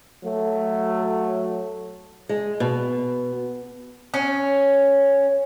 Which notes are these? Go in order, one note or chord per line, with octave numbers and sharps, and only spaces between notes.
F#3 A3
G#3
B2
C#4